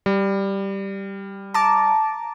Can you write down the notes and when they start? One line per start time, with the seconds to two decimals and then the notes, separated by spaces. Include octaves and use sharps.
0.06 G3
1.54 A5 A#5 D6